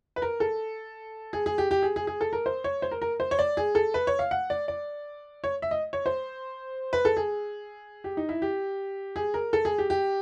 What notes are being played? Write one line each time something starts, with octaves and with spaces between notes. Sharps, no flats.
B4
A#4
A4
G#4
G#4
G4
G4
G#4
G#4
G#4
A4
A#4
C5
C#5
C5
A#4
A#4
C5
C#5
D5
G#4
A4
B4
C#5
F5
F#5
D5
D5
C#5
E5
D#5
C#5
C5
B4
A4
G#4
G4
D#4
E4
G4
G#4
A#4
A4
G#4
G4
G4